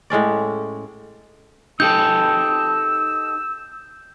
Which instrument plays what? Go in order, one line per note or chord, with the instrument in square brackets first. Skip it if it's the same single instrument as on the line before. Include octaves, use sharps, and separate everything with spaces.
[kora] A2 G#3 C#4 D5
[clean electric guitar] D#4 G4 A4 [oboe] E6 [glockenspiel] G6